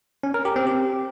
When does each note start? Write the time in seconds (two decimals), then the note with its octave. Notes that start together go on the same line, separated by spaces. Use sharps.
0.23 C#4
0.34 A#4
0.45 G4
0.56 C4
0.67 G4